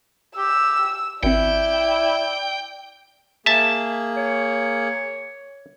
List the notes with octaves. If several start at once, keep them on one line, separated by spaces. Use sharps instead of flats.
G4 E6
G#1 C4 E4 D5 G5
A#3 G#4 E5 A5
C#5